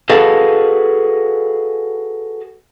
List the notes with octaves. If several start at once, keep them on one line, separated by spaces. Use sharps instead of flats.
F#4 G#4 A4 B4 D#5 F5